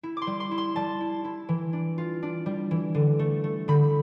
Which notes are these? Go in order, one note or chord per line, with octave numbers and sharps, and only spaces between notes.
E4
C6 D6
G3
C6
E4
C6
G3 A5
E4
E4
E3
D4
F4
D4
G3
E3
D3
A3
A3
D3 B5